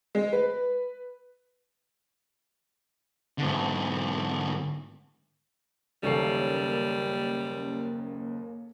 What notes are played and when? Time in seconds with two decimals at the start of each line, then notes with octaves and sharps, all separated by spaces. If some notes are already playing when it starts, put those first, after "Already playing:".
0.15 G#3
0.33 B4
3.38 G#2 D3
6.03 F#1 D#2 G3 A#3 C#4 A4 C#5 C7